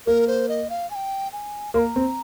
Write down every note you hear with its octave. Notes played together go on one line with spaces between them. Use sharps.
A#3 A#4
C5
D#5
F5
G#5
G5
G#5
A#3 C6
A#5
C4